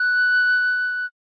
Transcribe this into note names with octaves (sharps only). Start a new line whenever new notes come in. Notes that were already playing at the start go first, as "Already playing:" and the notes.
Already playing: F#6